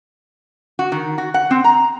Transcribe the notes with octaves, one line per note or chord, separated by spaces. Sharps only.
F#4
D#3
F#4
F#5
C4
A#5